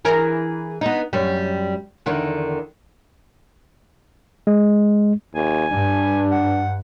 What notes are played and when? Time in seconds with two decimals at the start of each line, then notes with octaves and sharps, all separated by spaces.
0.05 E3 G#4 A#4
0.81 B3 D#4
1.13 F#2 G3
2.06 E2 D3 D#3
4.47 G#3
5.35 D#2 G#5
5.70 G2 D4
6.31 F#5